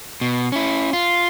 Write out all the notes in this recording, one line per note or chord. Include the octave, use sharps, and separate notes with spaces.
B2
C#4 E4
F4